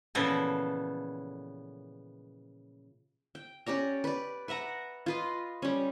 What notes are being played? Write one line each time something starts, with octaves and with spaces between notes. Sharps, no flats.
A#2 C#3 E3 F3 B3 A4
G5
C#4 G4 D5 A#5
B4 D5
B4 E5 F#5 A#5
F4 B4 D#5
G3 C#4